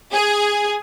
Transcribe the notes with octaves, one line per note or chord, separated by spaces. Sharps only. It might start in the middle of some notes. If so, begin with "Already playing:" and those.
G#4